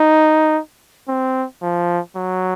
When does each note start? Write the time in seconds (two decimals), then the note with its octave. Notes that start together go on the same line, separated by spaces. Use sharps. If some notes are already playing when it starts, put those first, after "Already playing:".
Already playing: D#4
1.08 C4
1.62 F3
2.16 F#3